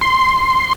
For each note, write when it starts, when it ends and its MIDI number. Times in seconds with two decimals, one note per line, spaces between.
0.01 0.73 84